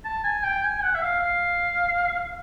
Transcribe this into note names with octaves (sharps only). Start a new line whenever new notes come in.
A5
G#5
G5
G#5
F#5
E5
F5
F5